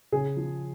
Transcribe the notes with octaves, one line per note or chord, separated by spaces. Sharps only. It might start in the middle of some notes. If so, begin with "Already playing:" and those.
C#3 G#4
F3